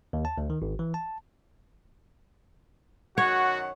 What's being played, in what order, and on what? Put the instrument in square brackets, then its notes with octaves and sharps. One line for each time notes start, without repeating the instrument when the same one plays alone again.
[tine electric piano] D#2
A5
D2
D#3
G#1
E3
A5
[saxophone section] F#2 D#3 F#5 [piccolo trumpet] F#4 [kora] C#5